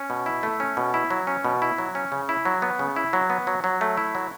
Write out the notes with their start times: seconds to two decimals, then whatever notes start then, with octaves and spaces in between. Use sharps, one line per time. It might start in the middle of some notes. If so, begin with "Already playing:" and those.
Already playing: C#4
0.10 B2
0.26 E4
0.43 A3
0.60 C#4
0.77 B2
0.94 E4
1.10 F#3
1.27 C#4
1.45 B2
1.62 E4
1.78 F#3
1.95 C#4
2.12 C#3
2.29 E4
2.45 F#3
2.62 B3
2.79 C#3
2.96 E4
3.13 F#3
3.30 B3
3.47 F#3
3.64 F#3
3.81 A3
3.97 E4
4.15 F#3